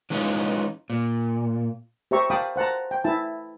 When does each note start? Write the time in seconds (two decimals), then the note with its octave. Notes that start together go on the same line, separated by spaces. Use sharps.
0.10 E3 G#3 C#4 D#4 F4
0.90 A#2
2.11 G4 C5 E5 A#5 C#6
2.30 F5 G5 A5 B5 D6 D#6
2.56 C5 F#5 A5 A#5
2.91 G5
3.04 E4 A5